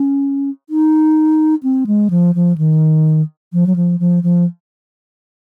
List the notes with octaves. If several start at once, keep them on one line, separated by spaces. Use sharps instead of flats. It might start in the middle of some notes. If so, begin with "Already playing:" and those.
Already playing: C#4
D#4
C4
G#3
F3
F3
D#3
F3
F#3
F3
F3
F3